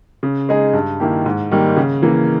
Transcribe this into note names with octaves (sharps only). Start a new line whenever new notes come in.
C#3
G#3 D#4 G#4
G2
D#3 A#3 E4 G4
G#2
D#3 G3 A#3
C#3
E3 A#3